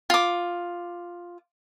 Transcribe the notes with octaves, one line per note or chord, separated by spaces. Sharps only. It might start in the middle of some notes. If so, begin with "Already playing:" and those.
F4 D6